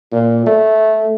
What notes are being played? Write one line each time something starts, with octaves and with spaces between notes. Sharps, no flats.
A#2
A3